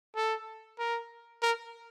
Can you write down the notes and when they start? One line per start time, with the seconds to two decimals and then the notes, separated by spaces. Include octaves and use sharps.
0.15 A4
0.79 A#4
1.42 A#4